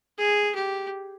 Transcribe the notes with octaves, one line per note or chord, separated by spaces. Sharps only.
G#4
G4